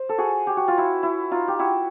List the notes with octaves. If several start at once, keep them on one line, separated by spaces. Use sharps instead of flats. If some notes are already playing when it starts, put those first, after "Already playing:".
Already playing: C5
A4
F#4 G#4
G4
F#4
F4
E4 F#4
E4
D#4 F4
G4
E4 F#4